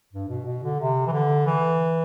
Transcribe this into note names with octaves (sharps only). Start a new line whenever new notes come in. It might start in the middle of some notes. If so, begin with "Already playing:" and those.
G2
B2
B2
D3
C3
E3
D3
E3